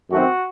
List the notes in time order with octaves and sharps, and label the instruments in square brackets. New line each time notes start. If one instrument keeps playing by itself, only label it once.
[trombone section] F#2 D#3 A3 C4 F#4